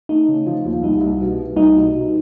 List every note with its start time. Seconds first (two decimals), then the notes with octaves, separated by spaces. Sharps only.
0.09 A3 D#4
0.28 C#3
0.46 F3
0.64 D#2
0.83 C2 D#4
1.01 C2
1.20 B2
1.38 B3
1.56 C2 D#4
1.76 B2
1.93 B2